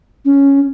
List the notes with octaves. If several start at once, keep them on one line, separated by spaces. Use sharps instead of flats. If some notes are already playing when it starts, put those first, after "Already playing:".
C#4